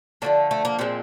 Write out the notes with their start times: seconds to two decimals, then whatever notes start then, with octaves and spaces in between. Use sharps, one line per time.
0.22 D3 F3 A3 A#3
0.51 A3
0.65 A#3
0.79 A#2 F3 G#3 C4